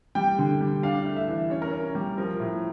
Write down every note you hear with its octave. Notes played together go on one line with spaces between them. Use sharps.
G3 G5
D3
G3
D4 F5
A3
E5
E3
C#4 C#5
A#4
C#4 C#5
G3
F3 A#4
A2